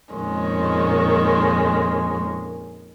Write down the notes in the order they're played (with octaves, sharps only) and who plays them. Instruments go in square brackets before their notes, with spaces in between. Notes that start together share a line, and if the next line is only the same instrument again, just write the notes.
[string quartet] F2 A#2 D#3 G#3 C#4